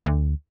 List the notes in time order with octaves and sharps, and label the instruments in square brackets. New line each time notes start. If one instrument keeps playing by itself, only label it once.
[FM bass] D2